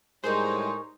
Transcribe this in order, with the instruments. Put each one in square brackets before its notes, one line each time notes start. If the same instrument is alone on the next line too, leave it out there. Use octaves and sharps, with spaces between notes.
[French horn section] A2 G3 G#3 [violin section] D#4 [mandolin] G#4 A#4 C#5 [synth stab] C5